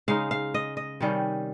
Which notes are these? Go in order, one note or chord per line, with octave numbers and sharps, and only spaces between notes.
C#3 G#3 D#4 F5
F5
D#5
D#5
C3 D#3 G3 C#4